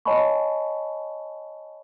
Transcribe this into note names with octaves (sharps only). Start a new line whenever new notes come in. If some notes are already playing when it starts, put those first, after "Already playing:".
C#5 D#5 G#5 A5 B5 C#6